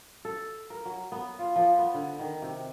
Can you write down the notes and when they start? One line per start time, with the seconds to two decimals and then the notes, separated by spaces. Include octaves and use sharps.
0.25 A4
0.70 A#4
0.85 F#3
1.12 B3
1.39 F4
1.56 F3
1.78 B3
1.94 D3
2.19 D#3
2.42 C3